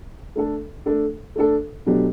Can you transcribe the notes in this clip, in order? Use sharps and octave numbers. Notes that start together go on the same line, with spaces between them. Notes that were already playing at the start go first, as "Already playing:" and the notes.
A3 D4 A4
A3 D4 A4
A3 D4 A4
B2 F#3 A3 D4 G4